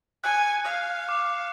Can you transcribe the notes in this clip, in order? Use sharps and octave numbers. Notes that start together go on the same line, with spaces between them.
G#5 F#6 C#7
F5
D6